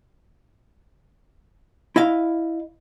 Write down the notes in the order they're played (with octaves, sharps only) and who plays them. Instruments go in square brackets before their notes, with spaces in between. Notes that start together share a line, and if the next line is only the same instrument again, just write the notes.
[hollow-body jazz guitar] E4 D#5 F5